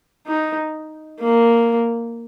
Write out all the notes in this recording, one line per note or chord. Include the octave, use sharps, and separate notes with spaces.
D#4
A#3